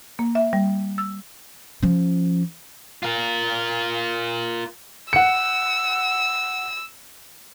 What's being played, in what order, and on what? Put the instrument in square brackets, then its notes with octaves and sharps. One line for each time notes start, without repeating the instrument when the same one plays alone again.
[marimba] A#3
E5
G3
E6
[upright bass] F3 C#4
[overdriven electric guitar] F4 A#4
[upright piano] F#5 C#7 [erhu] E6